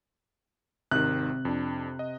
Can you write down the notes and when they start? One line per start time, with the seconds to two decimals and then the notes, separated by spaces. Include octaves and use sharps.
0.91 G#1 C3 D#3 F#6
1.45 F2 D4
1.99 D#5